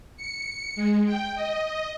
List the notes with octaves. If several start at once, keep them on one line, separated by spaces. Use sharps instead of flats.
C#7
G#3
G5
D#5